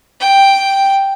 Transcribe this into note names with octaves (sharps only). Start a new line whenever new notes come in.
G5